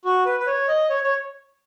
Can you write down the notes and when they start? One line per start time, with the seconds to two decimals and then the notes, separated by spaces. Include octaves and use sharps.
0.05 F#4
0.25 B4
0.40 B4
0.47 C#5
0.68 D#5
0.90 C#5
1.04 C#5